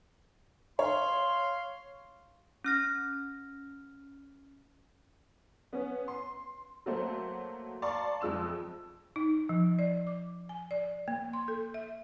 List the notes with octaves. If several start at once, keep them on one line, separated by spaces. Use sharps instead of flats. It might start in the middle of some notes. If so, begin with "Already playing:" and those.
C#5 F5 C6
C#4 F6 A#6
B3 C#4
C6
F#3 A3 A#3 C5
D5 F5 A5 A#5 C6 C#6
F2 F3 G#3 E6 E7
D#4
F3
D5
D6
G#5
D5
A#3
C6
A4
E5